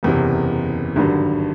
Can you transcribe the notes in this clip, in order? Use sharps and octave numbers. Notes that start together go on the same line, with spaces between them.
F#1 E2 C3
G#1 G2 D3 F#3